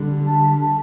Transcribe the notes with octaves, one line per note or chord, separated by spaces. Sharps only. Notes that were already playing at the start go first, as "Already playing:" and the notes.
Already playing: D3 G3
A5
A5